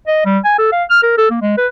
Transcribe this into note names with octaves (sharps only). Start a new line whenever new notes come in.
D#5
G3
G#5
A4
F5
F6
A#4
A4
A#3
G#3
B4